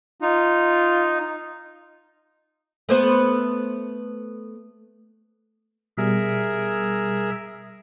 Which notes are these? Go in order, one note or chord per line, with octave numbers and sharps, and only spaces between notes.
D#4 F4
A3 B3 C5
B2 G3 G#4 A#4 E5